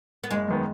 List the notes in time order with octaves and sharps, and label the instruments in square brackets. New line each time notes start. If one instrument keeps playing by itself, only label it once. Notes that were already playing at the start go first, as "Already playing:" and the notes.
[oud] B3
[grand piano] F#1 [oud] G#3
[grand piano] F#2 D#3 B3